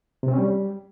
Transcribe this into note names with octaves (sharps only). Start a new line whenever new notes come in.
C3
C4
C#4
G3